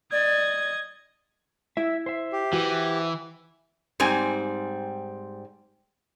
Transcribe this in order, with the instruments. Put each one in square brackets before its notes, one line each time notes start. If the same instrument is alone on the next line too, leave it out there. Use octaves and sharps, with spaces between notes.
[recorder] D5 [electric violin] D#5 G#6
[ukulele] E4 [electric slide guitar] E5
[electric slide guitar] C5 E5
[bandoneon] G4
[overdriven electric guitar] E3 [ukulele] F#4
[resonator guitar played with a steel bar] G#2 G3 C4 G#5